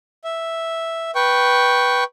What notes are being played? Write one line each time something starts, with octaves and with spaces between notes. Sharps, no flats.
E5
B4 G5 C#6